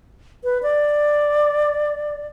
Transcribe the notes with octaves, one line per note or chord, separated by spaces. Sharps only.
B4
D5